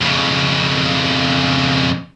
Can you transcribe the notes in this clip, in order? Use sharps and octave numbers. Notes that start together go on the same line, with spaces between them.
F2 C#3